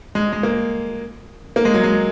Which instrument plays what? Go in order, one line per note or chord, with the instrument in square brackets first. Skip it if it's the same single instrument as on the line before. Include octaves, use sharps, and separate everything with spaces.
[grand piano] G#3
G#3
A#3
A#3
G#3
F#3
G#3